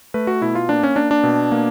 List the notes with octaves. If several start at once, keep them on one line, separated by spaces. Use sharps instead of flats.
A3 B4
F#4
B2 E4
F4
A#3 D4
C#4
A#3 D4
D4
B2
A#3